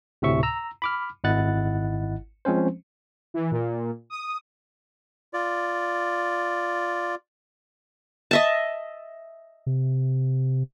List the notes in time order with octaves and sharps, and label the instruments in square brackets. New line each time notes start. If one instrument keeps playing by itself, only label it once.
[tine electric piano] D2 A2 C3 E5 C#6
A#5 E6
B5 D6 F6
G#1 E4 D#5 F#5 F#6 A6
F3 G#3 C4 C#4 C5
[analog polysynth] E3
A#2
D#6
[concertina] F4 D5
[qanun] D#5 E5 A5
[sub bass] C3